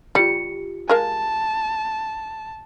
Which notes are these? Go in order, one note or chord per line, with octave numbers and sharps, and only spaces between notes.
G3 F4 G4 C#7
G#3 A#4 F5 A5